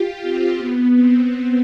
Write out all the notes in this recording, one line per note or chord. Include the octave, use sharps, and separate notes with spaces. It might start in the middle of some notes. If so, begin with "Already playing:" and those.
Already playing: F4 G4
C4
B3
C4
C4